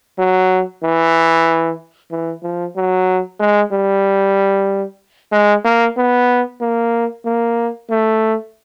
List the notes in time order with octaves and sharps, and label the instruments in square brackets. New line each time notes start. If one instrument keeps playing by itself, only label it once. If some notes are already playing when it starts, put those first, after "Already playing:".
[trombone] F#3
E3
E3
F3
F#3
G#3
G3
G#3
A#3
B3
A#3
A#3
A3